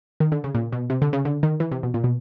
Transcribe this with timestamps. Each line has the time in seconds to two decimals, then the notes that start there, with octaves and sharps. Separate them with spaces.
0.20 D#3
0.32 D3
0.44 C#3
0.55 A#2
0.72 B2
0.90 C3
1.02 D3
1.13 C#3
1.25 D3
1.43 D#3
1.60 E3
1.72 C3
1.83 B2
1.94 A#2
2.04 B2